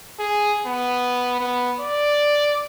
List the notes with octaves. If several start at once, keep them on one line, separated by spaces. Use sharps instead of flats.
G#4
B3
B3
D5